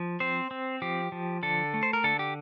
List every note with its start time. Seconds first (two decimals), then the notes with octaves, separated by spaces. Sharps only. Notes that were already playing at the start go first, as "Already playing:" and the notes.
Already playing: F3
0.20 C4 C5
0.51 C4
0.82 F3 G4
1.12 F3
1.43 D3 A4
1.74 A3
1.83 C5
1.93 A#4
2.04 D3 A4
2.19 G4